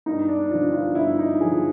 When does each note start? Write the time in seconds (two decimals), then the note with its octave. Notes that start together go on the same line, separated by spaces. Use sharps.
0.06 G2 D#4
0.29 D4
0.50 D3 F3 D4
0.73 F4
0.95 G2 E4
1.19 D#4
1.40 D3 F3 G#4